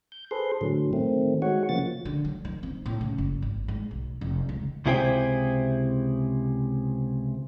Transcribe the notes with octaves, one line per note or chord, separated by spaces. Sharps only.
G6
G#4 A4 B4 C5 C6
A2 D3 F#3
D#3 A3 C4
G#3 F#4 C#5 F#5
C#3 F3 A#3 A6
D3
F#3
D#3
C4
A2
C#3
F#1
G#1
G#2
B1
F1
C#2
C#2 C3 E4 G#4 C5 G5